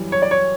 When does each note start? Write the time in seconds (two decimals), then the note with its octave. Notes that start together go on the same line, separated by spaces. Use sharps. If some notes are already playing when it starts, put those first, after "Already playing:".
Already playing: F#2 E3 G3
0.12 C#5
0.22 D5
0.31 C#5